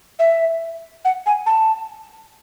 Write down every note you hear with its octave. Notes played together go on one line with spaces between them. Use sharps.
E5
F#5
G#5
A5